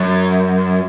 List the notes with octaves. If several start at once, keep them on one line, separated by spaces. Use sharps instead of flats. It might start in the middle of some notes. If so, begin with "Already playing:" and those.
Already playing: F#2